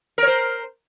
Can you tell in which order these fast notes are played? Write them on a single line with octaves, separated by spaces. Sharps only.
A#4 C#5 C5